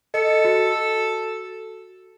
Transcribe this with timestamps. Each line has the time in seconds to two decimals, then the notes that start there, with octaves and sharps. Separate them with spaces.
0.14 A4 D#5 C#7
0.45 F#4